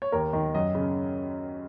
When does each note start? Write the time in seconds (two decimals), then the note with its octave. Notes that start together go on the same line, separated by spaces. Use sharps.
0.02 C#5
0.12 D#2 A#4
0.33 D#3
0.54 F#2 D#5
0.75 C#3